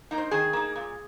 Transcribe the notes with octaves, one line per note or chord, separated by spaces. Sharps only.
A#3 D#4
C5
D#3 G#4
A#3 D#4
A#2